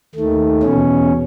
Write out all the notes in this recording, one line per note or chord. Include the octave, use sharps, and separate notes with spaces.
D#2 D#3 A3
E2 B2 C#4